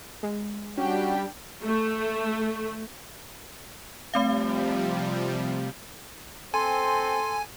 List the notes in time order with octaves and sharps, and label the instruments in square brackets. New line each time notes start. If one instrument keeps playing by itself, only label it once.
[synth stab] G#3
[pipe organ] G3 [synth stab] C#4 [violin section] D4 G4 G5 [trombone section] F#4
[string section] A3
[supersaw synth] C3 F3 G3 [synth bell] A3 C4 F5
[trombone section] C4 [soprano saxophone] A4 [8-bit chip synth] G#5 [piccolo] C6